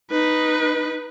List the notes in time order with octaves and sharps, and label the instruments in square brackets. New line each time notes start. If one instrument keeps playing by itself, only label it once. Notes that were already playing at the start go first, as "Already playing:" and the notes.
[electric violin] D#4 B4